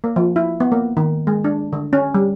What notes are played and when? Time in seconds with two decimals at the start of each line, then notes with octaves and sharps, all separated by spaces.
0.04 A#3
0.16 F3
0.36 E4
0.60 B3
0.72 A#3
0.97 D#3
1.27 G#3
1.44 D4
1.73 D3
1.93 C#4
2.14 G3